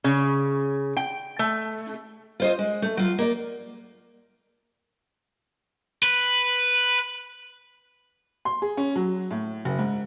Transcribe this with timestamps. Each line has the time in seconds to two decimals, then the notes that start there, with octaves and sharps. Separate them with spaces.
0.04 C#3
0.97 G5
1.39 A3
2.40 F4 C5 D#5
2.59 G#3
2.82 A3
2.97 F#3 F4
3.19 A#3 D5
6.03 B4
8.45 C6
8.62 G#4
8.77 C#4
8.96 F#3
9.31 A2
9.65 F#1
9.79 G#2